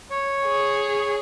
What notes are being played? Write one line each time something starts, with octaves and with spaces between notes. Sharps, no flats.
C#5
G#4